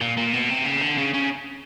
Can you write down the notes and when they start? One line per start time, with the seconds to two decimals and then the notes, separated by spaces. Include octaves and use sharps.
0.01 A#2
0.17 A#2
0.33 B2
0.49 C3
0.65 C#3
0.81 D3
0.97 C#3
1.14 C#3